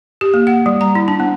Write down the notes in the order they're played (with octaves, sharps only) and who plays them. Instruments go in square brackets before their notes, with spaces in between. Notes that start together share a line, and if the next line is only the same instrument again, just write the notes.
[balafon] G4
A#3
F#5
G3
A#5
E4
D4
B3